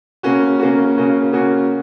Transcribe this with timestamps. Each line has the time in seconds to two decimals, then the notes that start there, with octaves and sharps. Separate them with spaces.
0.23 C#3 A#3 C#4 F#4
0.59 C#3 A#3 C#4 F#4
0.96 C#3 A#3 C#4 F#4
1.32 C#3 A#3 C#4 F#4